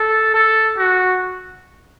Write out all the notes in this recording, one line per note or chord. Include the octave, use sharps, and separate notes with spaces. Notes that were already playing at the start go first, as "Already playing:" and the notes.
Already playing: A4
A4
F#4